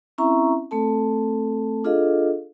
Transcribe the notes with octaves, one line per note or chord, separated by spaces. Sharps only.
C4 C#4 E4 E5 A#5 C#6
A3 C4 A4 A5
D4 F4 G#4 A4 D#5 F5